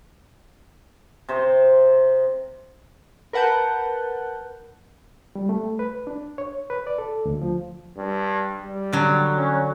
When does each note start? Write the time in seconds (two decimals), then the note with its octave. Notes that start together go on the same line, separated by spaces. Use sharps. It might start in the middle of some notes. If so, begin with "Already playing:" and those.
1.29 C3 C5 D#5
3.33 A#4 B4 F#5 A5 G6
5.35 G3
5.49 A3
5.79 B4
6.07 D4
6.38 C#5
6.70 B4
6.87 D5
6.98 A4
7.25 D2
7.42 F3
7.97 G2
8.63 G3
8.93 D3 F#3
9.36 C#4